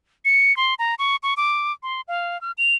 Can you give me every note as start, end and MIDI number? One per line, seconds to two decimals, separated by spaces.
0.25 0.55 97
0.57 0.74 84
0.79 0.95 82
0.99 1.16 85
1.23 1.34 85
1.37 1.72 86
1.83 2.01 84
2.08 2.40 77
2.41 2.52 89
2.58 2.75 101